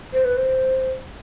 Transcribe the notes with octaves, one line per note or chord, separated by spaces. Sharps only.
C5
B4
C5